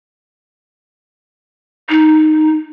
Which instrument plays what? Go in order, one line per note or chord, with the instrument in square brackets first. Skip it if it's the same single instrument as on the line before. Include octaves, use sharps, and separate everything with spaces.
[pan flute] D#4